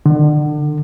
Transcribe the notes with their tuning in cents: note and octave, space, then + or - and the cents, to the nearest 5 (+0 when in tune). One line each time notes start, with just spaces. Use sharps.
D3 +35